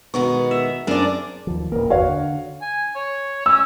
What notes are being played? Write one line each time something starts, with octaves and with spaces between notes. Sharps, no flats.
B2 D#3 G#3 B3 F#5 C#6
E5
F#2 C4 D4 G#4 A#4 D5
D#2 F3
D#1 G#1 A#3 A#4
G1 E2 F#4 C#5 F5
D3
G#5
C#5
C#4 E6